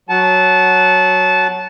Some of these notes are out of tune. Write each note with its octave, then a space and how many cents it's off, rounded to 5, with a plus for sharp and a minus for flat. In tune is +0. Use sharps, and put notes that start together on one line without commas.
F#3 +0 F#5 +0 A5 -20